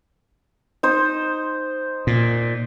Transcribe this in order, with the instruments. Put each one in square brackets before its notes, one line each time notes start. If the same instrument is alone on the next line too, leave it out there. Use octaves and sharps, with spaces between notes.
[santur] D#4 C5
[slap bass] A#2